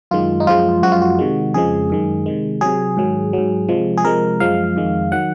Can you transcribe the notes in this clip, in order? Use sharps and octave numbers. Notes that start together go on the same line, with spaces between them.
F#2 D#3 G#3 F4
D#4
F#2 F3 G#3 F4
F#2 F3 G#3 F#4
F4
F#4
C3 D#3 G#3
F2 C#3 F3 G#3 G#4
F#2 D#3 G#3
C3 D#3 G#3
C3 F#3 G#4
G#2 D#3 F#3
G#2 F#3
C3 F3 G#3
G#4
C3 F3 G#3 A#4
F#2 F3 G#3 F5
F2 D#3 G#3
D#3 F#3 F#5